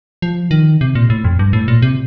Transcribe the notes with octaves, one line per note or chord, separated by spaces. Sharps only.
F3
D#3
C3
A#2
A2
F2
G2
A2
A#2
C3